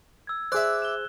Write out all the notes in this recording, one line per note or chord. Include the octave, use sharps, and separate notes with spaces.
E6 G#6
G#4 C5 D5 E5 F#6
E7 G7